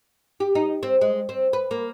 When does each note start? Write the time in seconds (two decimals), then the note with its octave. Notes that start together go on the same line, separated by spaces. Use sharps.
0.40 G4
0.55 D#4
0.83 C4
1.01 G#3
1.29 C4
1.53 B4
1.71 A#3